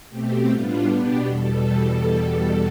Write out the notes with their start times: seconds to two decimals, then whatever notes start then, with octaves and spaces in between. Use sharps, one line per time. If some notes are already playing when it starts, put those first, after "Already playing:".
0.10 B2 A3 C4 G4
0.49 A2 G3 B3 D4 F4
0.87 B2 B3 D4 G4
1.25 E2 B2 G3 A4